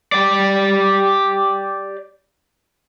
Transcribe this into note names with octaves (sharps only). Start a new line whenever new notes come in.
G4 D5